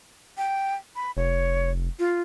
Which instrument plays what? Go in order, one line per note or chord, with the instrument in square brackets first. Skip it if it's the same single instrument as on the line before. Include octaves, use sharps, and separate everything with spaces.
[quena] G5
B5
[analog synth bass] F1 [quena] C#5
[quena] F4